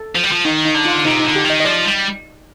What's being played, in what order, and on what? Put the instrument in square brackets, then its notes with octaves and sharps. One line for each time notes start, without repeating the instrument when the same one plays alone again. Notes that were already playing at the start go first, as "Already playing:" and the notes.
Already playing: [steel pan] A4
[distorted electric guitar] F3
G3
F3
[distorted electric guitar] D#3 [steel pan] D#4
[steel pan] D#4
[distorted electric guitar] D3
[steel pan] F4
[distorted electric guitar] C3 [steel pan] D#4
[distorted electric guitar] D3 [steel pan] D#4
[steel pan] G4
[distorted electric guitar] D#3
[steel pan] D#5
D#5
[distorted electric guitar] F3 [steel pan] D5
[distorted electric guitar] G3